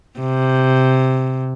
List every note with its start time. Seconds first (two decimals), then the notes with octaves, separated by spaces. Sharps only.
0.19 C3